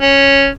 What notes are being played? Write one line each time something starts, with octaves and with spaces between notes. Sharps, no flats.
C#4